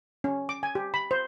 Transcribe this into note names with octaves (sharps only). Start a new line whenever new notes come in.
C#4
D6
G#5
G4
B5
C5